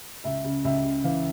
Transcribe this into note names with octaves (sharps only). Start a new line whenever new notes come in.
C#2 E5
C#3
C#2 E5
C#3
E3 F5